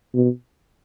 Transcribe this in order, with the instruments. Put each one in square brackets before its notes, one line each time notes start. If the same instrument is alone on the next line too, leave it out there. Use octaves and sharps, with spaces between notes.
[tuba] B2